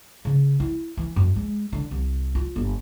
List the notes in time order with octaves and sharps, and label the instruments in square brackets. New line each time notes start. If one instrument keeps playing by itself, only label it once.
[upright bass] C#3
E4
E3
F#2
G#3
D3
C2
F4
G1